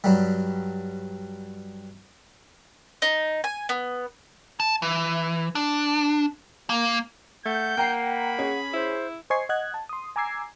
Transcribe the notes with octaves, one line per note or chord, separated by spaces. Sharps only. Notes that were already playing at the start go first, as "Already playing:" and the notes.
G2 F#3 G3
D#4
G#5
B3
A5
E3
D4
A#3
A3 F#5 G6
A#3 G5 A#5 C7
B5
C#4 G#4
E4 C5
C5 D#5 G#5 C#6 G#6 C7
D#5 F#5 F#6 G#6
A5
C6 D#6
G#5 A#5 D6 E6 G#6 C7